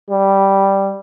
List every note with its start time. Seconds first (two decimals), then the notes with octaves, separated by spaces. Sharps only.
0.10 G3